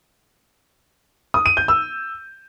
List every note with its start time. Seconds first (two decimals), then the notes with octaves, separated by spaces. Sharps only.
1.34 D#6
1.46 D#7
1.57 G6
1.68 E6